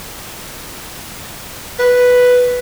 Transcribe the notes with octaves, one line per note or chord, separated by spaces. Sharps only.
B4